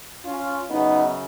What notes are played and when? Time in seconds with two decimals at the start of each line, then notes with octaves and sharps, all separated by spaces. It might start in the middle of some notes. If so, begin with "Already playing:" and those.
0.24 C#4 F4
0.68 F#2 C#3 B3 D#4